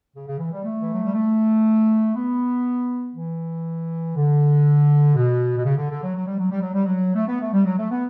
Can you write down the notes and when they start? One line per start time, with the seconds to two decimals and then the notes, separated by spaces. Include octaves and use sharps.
0.14 C#3
0.27 C#3
0.39 E3
0.52 G3
0.64 A3
0.81 E3
0.92 F#3
1.03 G3
1.14 A3
2.15 B3
3.14 E3
4.15 D3
5.15 B2
5.58 B2
5.65 C#3
5.77 D3
5.90 D3
6.03 F#3
6.15 F#3
6.26 G3
6.38 F#3
6.51 G3
6.62 F#3
6.74 G3
6.85 F#3
7.15 A3
7.27 B3
7.41 A3
7.53 G3
7.65 F#3
7.78 A3
7.91 B3